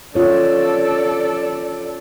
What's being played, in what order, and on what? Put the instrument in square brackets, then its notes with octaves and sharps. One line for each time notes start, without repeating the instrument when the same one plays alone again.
[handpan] C#4 F4 C#5 [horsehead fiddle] A4 D5